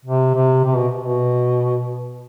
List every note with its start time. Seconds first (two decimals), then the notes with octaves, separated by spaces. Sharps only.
0.05 C3
0.35 C3
0.65 C3
0.76 B2
1.00 B2